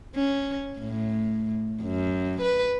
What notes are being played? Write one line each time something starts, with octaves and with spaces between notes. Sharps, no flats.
C#4
A2
F#2
B4